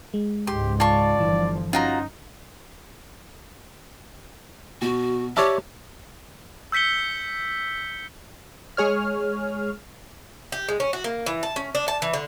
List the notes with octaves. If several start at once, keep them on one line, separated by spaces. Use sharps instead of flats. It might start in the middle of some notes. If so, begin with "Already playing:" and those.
G#3
C#2 G#2 G4 C6
F4 D5 A5 C#6
G1 E3 F3
C#4 D#4 F4 F#4 A#5
B2 F#4
G4 C#5 D5 E5 A5 F6
E6 G6 B6 C#7 G7
G#3 G#4 C#5 F6
G4
G#3
C#4
F#4
A#3
E3
A5
C#4
D4
A5
E3
D3